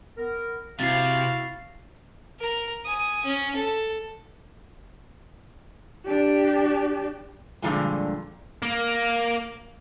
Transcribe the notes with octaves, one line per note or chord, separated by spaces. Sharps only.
B3 A#4
C3 E4 F#4 F5 A6 C7
A#4 A#5
G#5 D#6
C#4
A4
D4 G4
G2 A#2 D3 D#3 F3 G#3
A#3